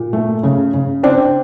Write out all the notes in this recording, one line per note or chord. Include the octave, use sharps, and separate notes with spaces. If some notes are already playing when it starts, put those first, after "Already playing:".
Already playing: A#2
A3
C#3
C#3
C4 D4